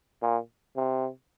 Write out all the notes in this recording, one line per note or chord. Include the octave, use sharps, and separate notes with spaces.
A#2
C3